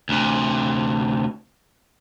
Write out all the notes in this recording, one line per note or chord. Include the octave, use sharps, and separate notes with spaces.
D2 C3